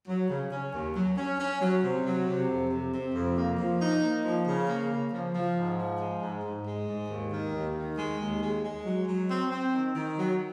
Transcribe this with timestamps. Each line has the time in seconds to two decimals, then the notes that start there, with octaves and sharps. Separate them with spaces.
0.08 F#3
0.30 C#3
0.52 C#4
0.74 D#2
0.96 F#3
1.17 C#4
1.40 C#4
1.61 F#3
1.84 C3
2.06 F#3
2.28 C3
2.50 F2
2.71 C3
2.93 C3
3.15 F2
3.37 A#3
3.59 F3
3.81 D#4
4.03 A#3
4.25 F3
4.47 C#3
4.68 A#3
4.90 C#3
5.13 F3
5.35 F3
5.56 G#2
5.78 F3
6.00 G#3
6.23 G#2
6.44 G#2
6.66 G#3
6.88 G#2
7.10 D#2
7.32 D#3
7.54 D#2
7.76 D#3
7.98 G#3
8.20 D#2
8.42 G#3
8.64 G#3
8.85 F#3
9.08 F#3
9.30 C4
9.52 C4
9.74 D#3
9.95 D#3
10.18 F#3